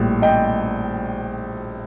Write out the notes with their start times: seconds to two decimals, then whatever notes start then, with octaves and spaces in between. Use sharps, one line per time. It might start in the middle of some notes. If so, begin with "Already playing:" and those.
Already playing: A#1 A2 G3
0.22 D#5 G5